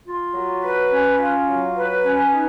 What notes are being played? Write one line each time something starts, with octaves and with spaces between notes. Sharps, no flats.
F4
F#3
B4
C#4
F4
F#3
B4
C#4
D#4